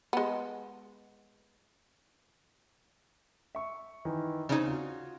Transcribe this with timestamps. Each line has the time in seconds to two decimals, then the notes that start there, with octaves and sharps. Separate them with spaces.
0.13 G#3 B3
3.55 E5 C#6
4.05 D#3 E3 E4
4.49 C#3 C4 D#4 D5 G#6
4.67 F4 F#4